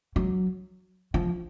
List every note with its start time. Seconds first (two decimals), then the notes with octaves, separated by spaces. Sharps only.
0.16 F#3
1.14 F3